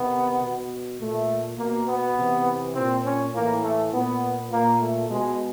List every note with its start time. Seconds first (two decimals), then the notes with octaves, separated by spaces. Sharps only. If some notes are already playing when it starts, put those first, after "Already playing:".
Already playing: C3 D#3 B3
0.41 B2
1.00 A#2 A3
1.58 B2 A#3
1.87 B3
2.17 C3 E3
2.75 A#2 C4
3.05 C#4
3.34 A2 E3 A#3
3.63 A3
3.92 A#2 B3
4.51 A#2 A#3
4.80 A3
5.10 B2 G#3